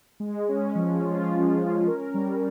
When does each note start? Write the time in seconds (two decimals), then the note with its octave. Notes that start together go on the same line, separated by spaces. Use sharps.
0.20 G#3
0.49 C#4
0.75 F3
1.04 F4
1.31 F3
1.58 C#4
1.87 A#4
2.14 G3